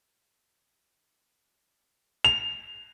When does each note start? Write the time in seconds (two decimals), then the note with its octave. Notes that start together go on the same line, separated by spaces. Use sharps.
2.24 F7